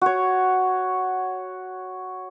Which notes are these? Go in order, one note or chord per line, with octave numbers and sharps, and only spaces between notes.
F#4 C#5